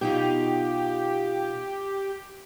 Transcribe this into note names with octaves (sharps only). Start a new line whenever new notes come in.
B2 D#4 F4 G4